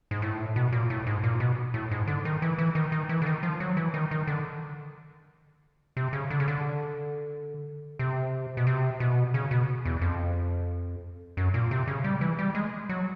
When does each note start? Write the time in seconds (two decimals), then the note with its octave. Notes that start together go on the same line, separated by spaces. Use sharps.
0.11 G#2
0.22 A2
0.56 B2
0.72 A#2
0.90 A2
1.07 G#2
1.23 A#2
1.40 B2
1.74 A2
1.91 G#2
2.07 D3
2.25 D#3
2.42 E3
2.58 E3
2.75 D#3
2.92 D#3
3.09 E3
3.22 D3
3.26 D#3
3.43 F3
3.60 F#3
3.77 E3
3.94 D#3
4.11 D#3
4.27 D3
5.97 C3
6.13 C#3
6.30 D3
6.40 C#3
6.48 D3
7.99 C3
8.57 B2
8.67 C3
9.00 B2
9.34 C#3
9.51 B2
9.85 E2
10.01 F2
11.37 F#2
11.54 A#2
11.71 C3
11.87 C#3
12.04 G3
12.21 E3
12.39 G3
12.55 G#3
12.89 F#3